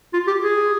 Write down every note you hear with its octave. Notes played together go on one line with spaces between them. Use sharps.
F4
G4
G#4